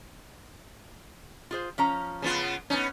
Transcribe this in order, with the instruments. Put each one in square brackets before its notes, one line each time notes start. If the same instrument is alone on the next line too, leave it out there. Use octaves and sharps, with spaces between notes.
[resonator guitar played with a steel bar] F4 G#4 C5
F3 C#4 A#5
[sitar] C#3 B3 F4
[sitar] B3 C#4 [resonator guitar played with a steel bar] D#4